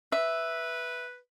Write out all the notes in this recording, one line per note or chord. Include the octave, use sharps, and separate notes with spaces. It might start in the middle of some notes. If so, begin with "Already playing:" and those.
B4 E5